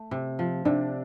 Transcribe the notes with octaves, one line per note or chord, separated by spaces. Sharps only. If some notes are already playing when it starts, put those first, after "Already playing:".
Already playing: A3
C3
F3
C3 D4